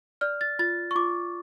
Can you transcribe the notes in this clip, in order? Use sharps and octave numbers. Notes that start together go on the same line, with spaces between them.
D5 F6
A6
F4 A6
C#6
F4 D6